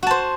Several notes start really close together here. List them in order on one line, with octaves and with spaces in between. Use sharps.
F#4 A5 C5